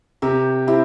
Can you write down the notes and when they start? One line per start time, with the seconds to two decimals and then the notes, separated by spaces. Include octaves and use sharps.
0.22 C3 G4 A#4
0.67 C4 E4 G4